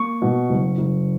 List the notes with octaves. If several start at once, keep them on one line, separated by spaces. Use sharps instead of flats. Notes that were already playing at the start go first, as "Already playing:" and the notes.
Already playing: A#3 C#6
B2
F#1
F#1